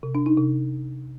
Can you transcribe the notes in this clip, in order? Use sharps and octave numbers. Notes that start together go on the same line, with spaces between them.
C3
D4
D#4
C3